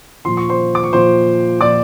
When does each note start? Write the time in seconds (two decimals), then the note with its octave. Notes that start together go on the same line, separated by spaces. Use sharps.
0.25 A#2 F3 C6
0.37 C#6
0.49 C5 C6
0.75 D6
0.84 C#6
0.93 A#2 F3 C5 C6
1.61 A#2 F3 D5 D6